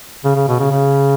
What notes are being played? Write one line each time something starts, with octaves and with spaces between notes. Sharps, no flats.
C#3
C#3
B2
C#3
C#3